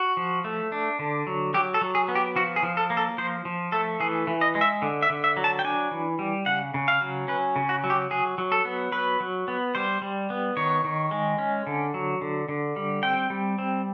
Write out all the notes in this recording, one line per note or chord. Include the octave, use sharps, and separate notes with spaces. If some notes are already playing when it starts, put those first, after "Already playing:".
Already playing: F#4
F3
A3
D4
D3
F#3
F#3 G4
A4
F#3
G#4
B3
G4
F3 F#4
G#4
F3
A4
A#3
A4
F3 C5
F3
A3 A4
E3 G#4
E3
D#5
G#3
E5
D3
E5
D3
E5
F#3
A5
G5
D4 G#5
E3
G3
C#3 F#5
C#3
F5
F#3
C#4 B4
C#3
F#4
F#3
G4
F#3 G#4
F#3
A4
B3
F#3 B4
F#3
B3
G3 C5
G3
B3
D#3 C#5
D#3
G#3
C#4
D3
F#3
D3
D3
G3
C4 G5
G3
C4